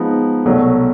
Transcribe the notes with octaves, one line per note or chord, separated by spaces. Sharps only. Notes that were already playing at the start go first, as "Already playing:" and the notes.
Already playing: F3 G#3 B3 D#4
C2 B2 F#3 A3